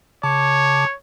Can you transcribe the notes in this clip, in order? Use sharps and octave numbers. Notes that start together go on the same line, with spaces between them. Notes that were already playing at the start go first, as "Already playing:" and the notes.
C#3 C#5 A5 D6